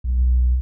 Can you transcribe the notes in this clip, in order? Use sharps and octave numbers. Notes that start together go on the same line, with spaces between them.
B1